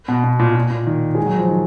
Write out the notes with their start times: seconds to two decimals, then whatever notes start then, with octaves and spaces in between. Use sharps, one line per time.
0.08 B2
0.24 B2
0.39 A#2
0.55 A#2
0.70 A#2
0.87 D#3
1.15 G#3
1.26 F#3
1.38 F3
1.49 D#3